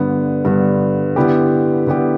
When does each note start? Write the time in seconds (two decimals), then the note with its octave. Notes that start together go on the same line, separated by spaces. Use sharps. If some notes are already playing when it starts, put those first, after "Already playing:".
Already playing: G2 D3 B3
0.45 G2 D3 B3
1.16 D3 B3 E4 G4
1.87 D3 B3 E4 G4